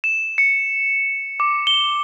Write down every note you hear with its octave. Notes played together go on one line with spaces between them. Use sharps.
E7
C#7
D6
G7